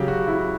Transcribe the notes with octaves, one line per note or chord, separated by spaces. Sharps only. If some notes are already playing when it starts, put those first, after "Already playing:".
Already playing: C#3 F#3 G4
F#4
E4